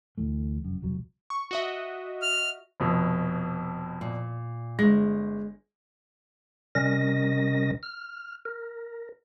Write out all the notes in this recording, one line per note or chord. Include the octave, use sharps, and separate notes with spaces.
D2 E3 A3
F1 F#2
E1 C2 F#3
C#6
F#4 D#5 E5
F6
F1 F2 B2
A#2
G1 G#3 A#6
C3 G3 C#4 A#4 D#5 A#6
F6
A#4